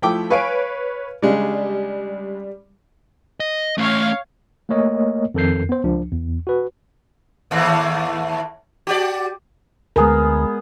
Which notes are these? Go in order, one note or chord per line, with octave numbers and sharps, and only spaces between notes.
F3 A3 E4 G5 D6
B4 C#5 F5 G#5 C#6 D7
C#3 G3 G#3 D4
D#5
A3 C#4 C#5 F5
A3 A#3 A#4 C#5 D#5
F2 D#3 A4 A#4 G6 C7
B3 C5
C#2 F3 D4
E2
F#4 B4
D#2 A2 E3
F#4 G4 D5
D2 G#3 B3 G#4 A#4 B5